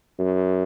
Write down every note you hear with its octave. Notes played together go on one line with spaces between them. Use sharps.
F#2